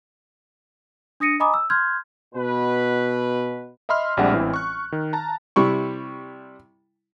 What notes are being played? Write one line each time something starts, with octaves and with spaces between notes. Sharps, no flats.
D4 D#6 A#6 C#7 D#7
D#5 G#5 A#5 B5 D6 D#6
E6
C6 F6 G6 G#6
B2 B4
D#5 E5 B5 C6 F6
A#1 G3 G#3 C4 D4 F#5
A1 E3 C4 E4
C#6 F#6
D#3
A5 A#5
C3 G3 E4 C#6